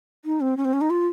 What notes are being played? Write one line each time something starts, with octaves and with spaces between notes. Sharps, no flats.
D#4
C4
C#4
C4
C#4
D#4
F4